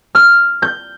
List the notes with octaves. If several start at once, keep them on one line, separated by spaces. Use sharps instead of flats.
F6
G6